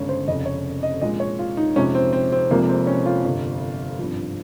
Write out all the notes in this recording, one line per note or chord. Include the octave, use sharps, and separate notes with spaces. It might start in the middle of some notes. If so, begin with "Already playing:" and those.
Already playing: G1 C#3 G#3 C#5
C5
F1 F2 C#3 D#5
C#5
D#5
A#1 A#2 G#3 D#5
C#5
F4
D#4
F2 C3 F3 G#3 C#4
C4
C4
C4
F1 F2 C3 F3 G#3 A#3
C4
C#4
F4
G1 F2 C3
G#1 G2 F3